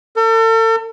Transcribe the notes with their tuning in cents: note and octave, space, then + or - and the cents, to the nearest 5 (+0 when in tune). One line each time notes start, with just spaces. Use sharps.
A4 +40